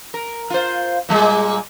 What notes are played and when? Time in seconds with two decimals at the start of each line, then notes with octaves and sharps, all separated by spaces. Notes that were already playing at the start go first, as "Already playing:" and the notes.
0.14 A#4
0.50 F4 C5
1.09 A#2 G3 G#3